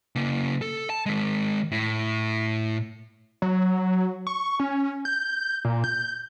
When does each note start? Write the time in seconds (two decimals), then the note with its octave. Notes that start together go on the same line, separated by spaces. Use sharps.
0.16 C#3 A#3
0.61 A4
0.90 A5
1.06 D#3 G#3
1.72 A2
3.42 F#3
4.27 C#6
4.60 C#4
5.05 G6
5.65 A#2
5.84 G6